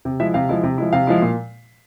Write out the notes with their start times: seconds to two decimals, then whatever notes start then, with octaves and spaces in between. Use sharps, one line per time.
0.05 C3
0.20 F3 G#3 E4 E5
0.34 C3 F5
0.49 F3 G#3 E4
0.63 C3
0.78 F3 G#3 E4
0.93 C3 F5
1.07 F3 G#3 E4
1.22 A#2